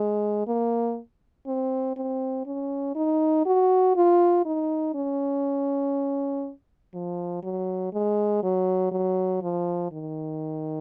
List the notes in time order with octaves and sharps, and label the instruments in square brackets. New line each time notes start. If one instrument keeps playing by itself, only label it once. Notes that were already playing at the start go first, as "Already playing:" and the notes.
Already playing: [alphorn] G#3
A#3
C4
C4
C#4
D#4
F#4
F4
D#4
C#4
F3
F#3
G#3
F#3
F#3
F3
D#3